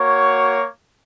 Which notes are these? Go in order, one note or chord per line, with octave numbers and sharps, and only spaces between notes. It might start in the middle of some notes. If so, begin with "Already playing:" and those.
Already playing: A#3 F#4 C#5